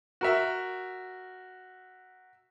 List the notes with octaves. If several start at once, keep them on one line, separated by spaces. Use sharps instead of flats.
F#4 A#4 E5